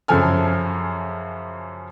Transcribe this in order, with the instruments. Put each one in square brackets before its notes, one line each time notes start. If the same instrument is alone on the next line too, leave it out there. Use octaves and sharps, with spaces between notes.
[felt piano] F#2 C#3 F3 A4 G#5 F6